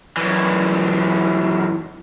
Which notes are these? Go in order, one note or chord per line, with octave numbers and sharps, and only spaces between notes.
F#2 E3